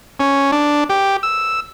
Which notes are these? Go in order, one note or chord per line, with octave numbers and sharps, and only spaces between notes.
C#4
D4
G4
E6